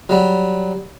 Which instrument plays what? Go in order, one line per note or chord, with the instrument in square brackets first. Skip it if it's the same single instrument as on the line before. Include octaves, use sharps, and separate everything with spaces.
[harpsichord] F#3 G3